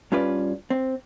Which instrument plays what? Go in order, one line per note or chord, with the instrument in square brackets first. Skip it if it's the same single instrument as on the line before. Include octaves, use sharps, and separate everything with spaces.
[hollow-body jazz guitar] G2 C#4 F4 B4 D5
C4